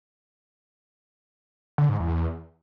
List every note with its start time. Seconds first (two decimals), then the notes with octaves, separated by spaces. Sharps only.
1.78 D3
1.89 G#2
2.00 E2